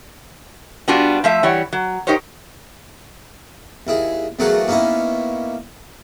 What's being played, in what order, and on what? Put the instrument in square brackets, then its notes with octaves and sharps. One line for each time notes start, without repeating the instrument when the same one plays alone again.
[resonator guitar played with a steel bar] G3 B3 D4 F4 F#4
F3 A3 E5
E3 G3 C#5 F#5
F#3
D#4 G4 A#4 C5 C#5
[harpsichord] D#2 E4 G#4
E2 F#3 A3 A#3 G#4 F#5
A#3 B3 C#4 D#4 E4